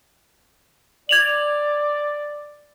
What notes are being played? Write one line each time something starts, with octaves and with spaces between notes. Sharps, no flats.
D5 G#6 F7 F#7